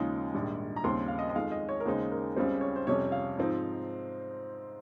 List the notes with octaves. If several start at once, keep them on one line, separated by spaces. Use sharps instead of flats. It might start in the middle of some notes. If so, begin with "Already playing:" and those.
Already playing: D#2 C#3 F3 G#3 D#4
A#1 G#2 D#3 G3
A#5
D#2 C#3 G3 C4 C6
F5
D#5
D#5
F2 D#3 G#3 F5
D#5
C#5
A#4
D#2 C#3 G#3 D#4 C5
A#4
C#2 C#3 G3 C4 C5
C#5
C5
F2 C3 G3 C#4 C#5
F5
G#2 F3 C4 D#4